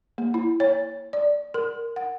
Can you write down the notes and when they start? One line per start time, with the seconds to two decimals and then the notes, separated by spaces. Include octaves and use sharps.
0.18 A#3
0.34 E4
0.60 C#5
1.13 D5
1.54 A#4
1.96 F#5